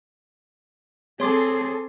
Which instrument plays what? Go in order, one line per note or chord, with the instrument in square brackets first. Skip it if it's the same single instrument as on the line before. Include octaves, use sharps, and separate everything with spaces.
[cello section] C4 G#4 A4 [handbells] C#5 C6 D6